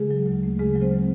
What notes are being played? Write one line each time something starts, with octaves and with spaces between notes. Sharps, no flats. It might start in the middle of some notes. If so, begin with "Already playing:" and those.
Already playing: C#3 G#3 G#4
F#3
D2
A3
C#3 G#3 G#4
F#3
C4 C5